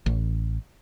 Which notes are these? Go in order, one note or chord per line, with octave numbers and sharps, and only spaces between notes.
A1